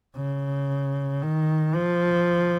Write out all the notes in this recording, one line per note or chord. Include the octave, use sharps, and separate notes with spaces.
C#3
D#3
F3